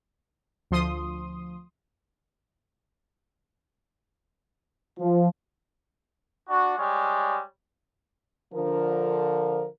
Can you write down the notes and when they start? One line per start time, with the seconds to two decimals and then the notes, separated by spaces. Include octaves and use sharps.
0.71 D2 F3 C6 D#6
4.99 F3
6.48 D4 F#4
6.77 G3 G#3 C#5
8.54 D3 F3 A#4